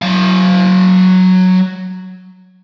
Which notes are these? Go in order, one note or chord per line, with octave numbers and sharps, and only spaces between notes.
F#3 F5